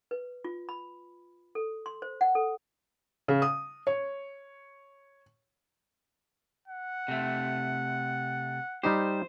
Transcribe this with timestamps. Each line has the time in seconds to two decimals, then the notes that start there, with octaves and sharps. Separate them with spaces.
0.11 B4
0.44 F4
0.69 B5
1.55 A4
1.86 C6
2.02 C5
2.21 F#5
2.35 A4
3.28 C#3
3.42 D#6
3.87 C#5
6.68 F#5
7.08 C3 A3
8.84 G3 D#4 G4 C5